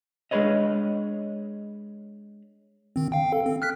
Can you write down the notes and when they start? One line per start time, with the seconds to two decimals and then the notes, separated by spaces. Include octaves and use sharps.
0.31 G#3 D4 G#4 B4 C#5 D#5
2.96 D#3 C4
3.12 F5 G5
3.32 A4
3.46 C4
3.62 F6 F#6 B6